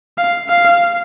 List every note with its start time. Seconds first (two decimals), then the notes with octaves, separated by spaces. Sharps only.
0.18 F5
0.49 F5